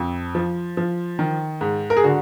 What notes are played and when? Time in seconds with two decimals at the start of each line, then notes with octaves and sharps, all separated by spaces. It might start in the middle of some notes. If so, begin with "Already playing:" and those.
Already playing: F2
0.35 F3
0.77 F3
1.19 D#3
1.61 G#2
1.90 A#4
1.97 G#4
2.04 D3 F#4